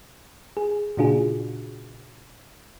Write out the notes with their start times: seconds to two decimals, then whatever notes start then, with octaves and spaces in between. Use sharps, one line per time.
0.57 G#4
0.97 A#2 C#3 D4 F4 F#4 G#4